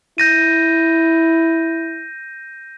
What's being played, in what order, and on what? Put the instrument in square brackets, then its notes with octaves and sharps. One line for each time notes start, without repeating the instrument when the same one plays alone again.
[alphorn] E4 [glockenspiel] G6 A#6 D#7